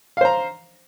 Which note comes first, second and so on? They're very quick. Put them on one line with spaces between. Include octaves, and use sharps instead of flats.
F5 C5 A#5